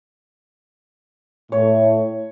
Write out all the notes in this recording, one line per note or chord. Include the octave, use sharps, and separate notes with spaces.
A2 C#5